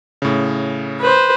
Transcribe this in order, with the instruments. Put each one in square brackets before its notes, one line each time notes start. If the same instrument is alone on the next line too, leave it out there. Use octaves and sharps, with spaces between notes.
[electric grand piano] A2 C#3
[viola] B4 C5